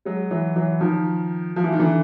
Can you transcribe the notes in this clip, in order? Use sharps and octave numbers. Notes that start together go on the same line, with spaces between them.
F#3 G#3
E3 F#3
E3 F#3
D#3 F3
F3
E3
D#3
D3 E3